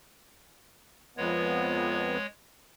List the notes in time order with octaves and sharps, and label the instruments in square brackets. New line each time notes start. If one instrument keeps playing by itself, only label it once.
[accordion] F2 B3 [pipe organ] G#3 C#5